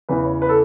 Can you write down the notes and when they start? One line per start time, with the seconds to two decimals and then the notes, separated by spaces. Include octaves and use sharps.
0.09 E2 C#3 E3 B4
0.25 C#5
0.42 B4
0.49 A4